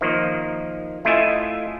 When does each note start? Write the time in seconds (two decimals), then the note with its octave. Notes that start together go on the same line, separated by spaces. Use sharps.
0.01 D#3 F3 A#3
1.05 A3 E4 F4 D#5 E5 G#5